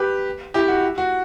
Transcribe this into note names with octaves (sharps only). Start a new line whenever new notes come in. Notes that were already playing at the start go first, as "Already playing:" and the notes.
Already playing: G4 B4
E4 G4
F#4
F#4